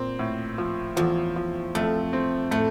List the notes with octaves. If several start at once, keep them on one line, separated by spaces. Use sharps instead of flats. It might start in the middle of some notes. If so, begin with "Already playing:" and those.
Already playing: A#2 C4
A2
F3
E2 F3
F3
F2 A3
C4
A2 A3